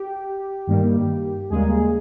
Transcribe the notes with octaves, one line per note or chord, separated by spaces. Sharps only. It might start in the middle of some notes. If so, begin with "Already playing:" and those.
Already playing: G4
G2 D#3 G3 A#3
D#2 C#3 G3 G#3 A#3 G#4